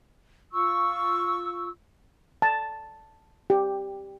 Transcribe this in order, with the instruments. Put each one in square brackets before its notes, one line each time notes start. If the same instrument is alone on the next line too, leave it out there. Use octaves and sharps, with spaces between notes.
[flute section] F4 C#6 E6
[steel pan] A5
G4